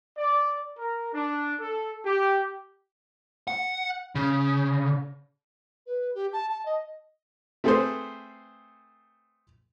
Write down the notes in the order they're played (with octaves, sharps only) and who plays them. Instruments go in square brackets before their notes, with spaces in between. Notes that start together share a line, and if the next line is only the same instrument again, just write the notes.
[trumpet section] D5
A#4
D4
A4
G4
[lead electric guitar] F#5
C#3
[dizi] B4
G4
A5
A5
D#5
[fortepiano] A3 C4 G#4 A4 B4 C5